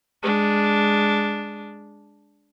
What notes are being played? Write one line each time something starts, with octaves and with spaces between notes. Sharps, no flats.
G#3 D4